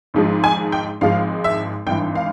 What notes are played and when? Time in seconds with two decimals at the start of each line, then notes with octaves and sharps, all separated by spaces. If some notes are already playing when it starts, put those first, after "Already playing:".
0.14 G#1 G#2 F3 G#3
0.44 G#5
0.72 G5
1.01 G#1 G#2 F3 G#3 F5
1.44 E5
1.86 G#1 G2 E3 G5
2.15 F5